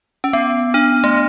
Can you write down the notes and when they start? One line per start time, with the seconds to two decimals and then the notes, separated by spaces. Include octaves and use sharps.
0.24 C#4
0.33 B3
0.74 D4
1.04 A3